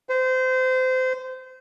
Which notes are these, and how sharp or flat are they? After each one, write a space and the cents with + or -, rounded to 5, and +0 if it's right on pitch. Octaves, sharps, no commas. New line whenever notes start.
C5 -25